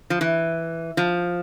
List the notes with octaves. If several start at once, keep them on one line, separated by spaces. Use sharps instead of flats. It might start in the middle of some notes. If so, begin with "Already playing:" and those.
F3
E3
F3